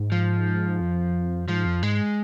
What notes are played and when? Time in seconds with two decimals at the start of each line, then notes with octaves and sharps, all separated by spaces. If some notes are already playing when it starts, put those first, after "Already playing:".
Already playing: G#2
0.12 F3
0.80 F2
1.48 G#2 F3
1.66 F2
1.83 G#2 G#3